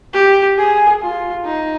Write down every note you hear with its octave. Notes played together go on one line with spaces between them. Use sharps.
G4
G#4
F4
D#4